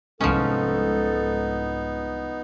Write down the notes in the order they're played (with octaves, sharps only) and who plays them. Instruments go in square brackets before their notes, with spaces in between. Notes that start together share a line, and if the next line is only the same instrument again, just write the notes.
[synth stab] C2 G#2 G#3 [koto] F3 C#4 [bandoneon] B3 D#4 [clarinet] A4